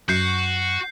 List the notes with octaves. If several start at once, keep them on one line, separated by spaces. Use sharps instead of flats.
F#2 F#4 G6 C7